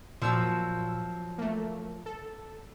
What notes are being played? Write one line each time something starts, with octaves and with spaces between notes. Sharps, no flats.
A#2 F3 F#3 E6
A3 A#3
A4